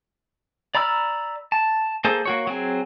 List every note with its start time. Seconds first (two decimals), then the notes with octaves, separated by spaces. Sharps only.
0.75 D5 A#5 B5 E6 F6
1.52 A5
2.05 A#3 G#4 A4 C5
2.25 A#3 F#4 C#5
2.47 F#3 C4 G#4